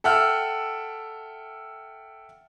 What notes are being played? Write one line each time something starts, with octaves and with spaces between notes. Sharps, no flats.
A4 E5 F#5 G5 E6 F6